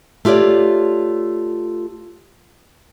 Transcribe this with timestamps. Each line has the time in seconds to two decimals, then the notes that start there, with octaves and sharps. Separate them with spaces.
0.25 A3 F4 G4 C#5 D5